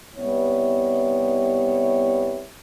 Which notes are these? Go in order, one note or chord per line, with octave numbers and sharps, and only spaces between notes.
C3 G3 B3 E4 C#5